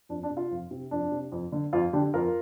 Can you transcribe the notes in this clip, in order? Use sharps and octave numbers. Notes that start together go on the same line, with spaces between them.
F2 D4
D4
C3
F4
F2
C3
F2 D4
C3
F2
D3
F2 F4
D3 D4 G4
F2 F4 A#4